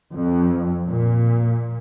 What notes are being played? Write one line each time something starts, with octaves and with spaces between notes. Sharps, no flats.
F2
A#2